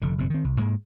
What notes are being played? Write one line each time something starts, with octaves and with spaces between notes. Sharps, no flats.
F1 F2 D3
F#1 G#2 B2 C4
D#3 C4
C2
G#2 G#3 A#3